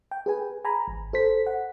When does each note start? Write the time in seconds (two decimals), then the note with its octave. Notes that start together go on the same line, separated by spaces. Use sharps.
0.11 G5
0.26 G#4 B4 G#5
0.65 G#5 A#5 B5
0.88 G#1
1.13 A4 C5 B6
1.46 F#5